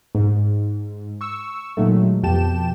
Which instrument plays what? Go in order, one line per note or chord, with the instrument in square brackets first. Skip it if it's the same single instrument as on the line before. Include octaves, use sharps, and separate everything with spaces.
[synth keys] G#2
C#6 E6
A#2 D#3 F#3 G#3 A3
F2 B2 G4 G5 A5 E7